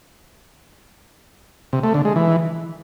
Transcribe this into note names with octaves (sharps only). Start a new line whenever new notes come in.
C3
A3
D3
G#3
E3